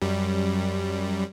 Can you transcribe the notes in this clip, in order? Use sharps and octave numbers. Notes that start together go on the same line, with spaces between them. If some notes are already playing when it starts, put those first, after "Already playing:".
F#2 G3